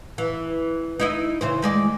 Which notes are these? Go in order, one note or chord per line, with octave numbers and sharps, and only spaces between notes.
E3
D#4 E4 D#5
C#3 E3 C5
D#3 G#3 D5